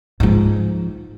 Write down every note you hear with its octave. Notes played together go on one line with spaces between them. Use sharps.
G#2 F3